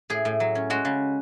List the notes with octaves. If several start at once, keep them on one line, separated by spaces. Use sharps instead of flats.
A2 G#4
A2
F#3
C#4
G#3 F#4
C#3